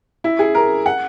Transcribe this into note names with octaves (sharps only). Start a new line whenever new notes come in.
E4
G#4
A#4
F#5